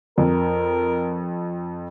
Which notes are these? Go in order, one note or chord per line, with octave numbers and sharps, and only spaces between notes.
F2 A#4